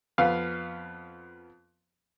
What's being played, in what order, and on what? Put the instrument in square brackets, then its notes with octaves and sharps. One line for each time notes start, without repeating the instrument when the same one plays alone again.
[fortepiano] F2 B3 F5